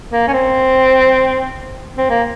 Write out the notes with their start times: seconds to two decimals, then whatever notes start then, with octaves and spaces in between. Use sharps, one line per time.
0.13 A#3
0.28 C#4
0.33 C4
1.98 C4
2.10 A#3